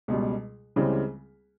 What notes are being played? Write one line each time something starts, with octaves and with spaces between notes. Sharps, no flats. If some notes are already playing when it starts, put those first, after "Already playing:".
C#2 B2 G3
C#2 C#3 E3 G3 C4